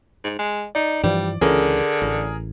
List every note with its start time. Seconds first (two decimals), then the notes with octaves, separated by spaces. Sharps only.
0.24 G#2
0.38 G#3
0.75 D#4 D5
1.03 G2 E3 F3 G3
1.41 C#2 D3 E3 C#4 G#4 A#4
2.02 A1